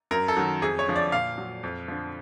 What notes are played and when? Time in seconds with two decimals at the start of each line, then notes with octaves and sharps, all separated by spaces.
0.11 F#2 A#4
0.28 A4
0.37 D#3 F#3
0.62 F2 G#4
0.79 C#5
0.87 D3 F3
0.96 D5
1.12 A#2 F5
1.38 F#3
1.63 F2
1.88 D3 F3